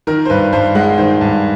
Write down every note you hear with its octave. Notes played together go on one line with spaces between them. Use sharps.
D#3 A#4
C5
G2 B4
G2 C5
G#3 F#5
D#3 C5
G2